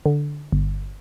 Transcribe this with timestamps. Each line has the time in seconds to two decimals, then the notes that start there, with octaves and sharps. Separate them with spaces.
0.06 D3
0.52 G1